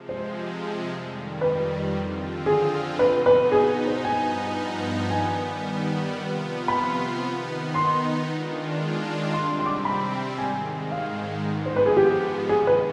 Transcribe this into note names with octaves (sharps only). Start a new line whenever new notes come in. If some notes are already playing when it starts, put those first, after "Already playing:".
Already playing: C3 F3 G#3
C5
F2 D#3 G3
B4
D3 F3 C4 F4
G#4
B2 B3 D#4 B4
B4
G#4
C5
G2 F3 B3 D#4 G#5
D#3 G3 B3 G#5
C3 F3 B3 F4
B5
D#3 B3 D#4
C6
D#3 G#3 D4 F4
C3 G3 C4 C6
C6
D6
C6
B5
G#2 D#3 G#3 G#5
F5
G#2 F3 B3
C5
B4
G#4
G4
C3 D#3 G#3 G#4
B4